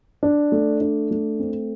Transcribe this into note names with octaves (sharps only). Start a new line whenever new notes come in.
D4
A3
D4
A3
C4